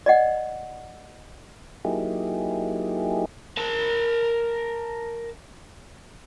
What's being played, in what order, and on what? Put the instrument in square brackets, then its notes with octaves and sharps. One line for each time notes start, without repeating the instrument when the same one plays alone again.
[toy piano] D5 D#5 F#5
[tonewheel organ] F#3 A#3 D#4 E4 G4 G#4
[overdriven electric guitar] A#4 A5